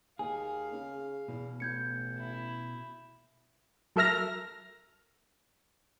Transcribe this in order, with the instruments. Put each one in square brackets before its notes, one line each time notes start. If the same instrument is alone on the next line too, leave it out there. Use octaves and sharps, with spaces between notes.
[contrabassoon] D#2 [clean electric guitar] G#4 [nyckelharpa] F5 [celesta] G#5
[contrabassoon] C#3
[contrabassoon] E2 [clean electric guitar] B2
[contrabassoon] A1 [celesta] G6 G#6 C#7
[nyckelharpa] E4
[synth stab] F#3 A4 A#4 E5 F6 A#6